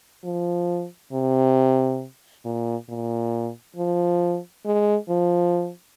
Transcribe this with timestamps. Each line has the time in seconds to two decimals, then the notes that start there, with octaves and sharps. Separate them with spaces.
0.24 F3
1.13 C3
2.45 A#2
2.89 A#2
3.76 F3
4.66 G#3
5.09 F3